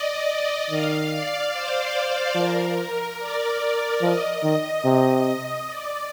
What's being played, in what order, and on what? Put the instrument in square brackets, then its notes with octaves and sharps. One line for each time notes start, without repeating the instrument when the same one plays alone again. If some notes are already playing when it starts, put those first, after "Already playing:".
Already playing: [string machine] D5 D#5
[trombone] D#3 [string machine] F5
[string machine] D5
C5
[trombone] F3 [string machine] A#4
[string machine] D5
[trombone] F3 [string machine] D#5
[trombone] D#3
[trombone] C3 [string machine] D#5
[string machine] D5